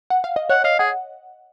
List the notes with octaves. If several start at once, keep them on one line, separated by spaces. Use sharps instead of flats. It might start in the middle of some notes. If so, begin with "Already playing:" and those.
F#5
F5
D#5
C#5 F#5
D#5 F5
G#4 F#5